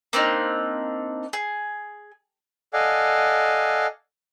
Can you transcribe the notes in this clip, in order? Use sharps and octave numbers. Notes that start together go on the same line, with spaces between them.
A#3 C4 D4 D#4
G#4
A4 D5 D#5 F5 F#5 G#5